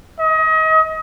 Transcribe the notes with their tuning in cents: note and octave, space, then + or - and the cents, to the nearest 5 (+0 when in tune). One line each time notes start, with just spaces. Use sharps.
D#5 +30